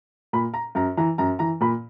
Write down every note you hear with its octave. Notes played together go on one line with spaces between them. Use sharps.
A#2 B5
A#5
F#2 A#5
E3 A#5
F#2 A#5
E3 A#5
A#2 B5